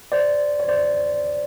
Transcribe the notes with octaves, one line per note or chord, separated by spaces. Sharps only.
C5 D5
C#5
C5 D5